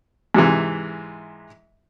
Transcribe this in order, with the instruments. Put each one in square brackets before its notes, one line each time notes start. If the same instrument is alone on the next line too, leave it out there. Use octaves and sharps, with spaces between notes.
[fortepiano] G#2 C3 E3